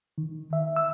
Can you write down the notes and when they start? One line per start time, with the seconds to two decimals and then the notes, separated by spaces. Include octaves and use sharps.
0.18 D#3
0.53 E5
0.76 E6